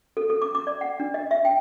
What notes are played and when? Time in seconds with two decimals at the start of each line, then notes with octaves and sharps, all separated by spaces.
0.17 A4
0.30 A4
0.42 D6
0.55 D6
0.67 D5
0.81 F#5
1.00 D4
1.14 D#5
1.31 E5
1.45 G5